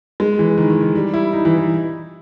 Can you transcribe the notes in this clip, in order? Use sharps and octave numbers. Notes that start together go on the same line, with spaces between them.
G#3
E3
D#3
D#3
D#3
G3
E4
D#4
E3
E3